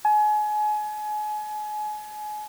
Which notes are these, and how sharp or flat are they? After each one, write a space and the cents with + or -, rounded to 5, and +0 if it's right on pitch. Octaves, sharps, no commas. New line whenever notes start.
G#5 +30